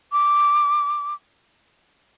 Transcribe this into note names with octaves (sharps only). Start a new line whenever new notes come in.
D6